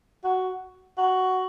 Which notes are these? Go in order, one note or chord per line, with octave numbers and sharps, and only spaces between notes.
F#4
F#4